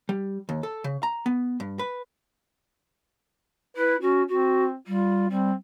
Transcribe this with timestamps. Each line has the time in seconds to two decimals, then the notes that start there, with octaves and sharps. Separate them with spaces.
0.09 G3
0.49 D#2
0.63 A4
0.84 C#3
1.03 A#5
1.26 B3
1.60 G2
1.79 B4
3.76 E4 B4
4.01 C#4 F#4
4.28 C4 F#4
4.87 G3 F4
5.30 G3 C4